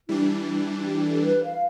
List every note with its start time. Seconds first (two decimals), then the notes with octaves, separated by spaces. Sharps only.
0.08 E3 G3 D4 E4
0.78 F4
0.85 G4
1.04 A4
1.24 B4
1.44 F5